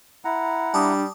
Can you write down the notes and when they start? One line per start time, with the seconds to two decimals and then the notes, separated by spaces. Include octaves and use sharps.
0.25 E4 F#5 A#5
0.74 G3 D4 A5 D6 D#6